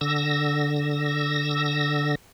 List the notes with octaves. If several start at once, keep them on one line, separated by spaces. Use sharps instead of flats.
D3 E6 A#6